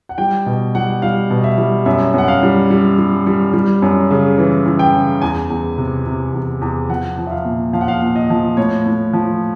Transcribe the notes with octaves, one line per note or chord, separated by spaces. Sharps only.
F#5
G3 G5
B2
G3 F#5
G3 F5
B2
E5
G3
F#2 E5
F#2 F#5
F5
G3
G3
G3
G3
G3
F#2
C#3
E3
E3
G5
C#3
E2 G#5
E2
C3
C3
E2
E2
F3 F#5
F3
E5
F5
A#2
F3 F5
F#5
F5
A#2
D#5
F3
A2 C#5
A2
F3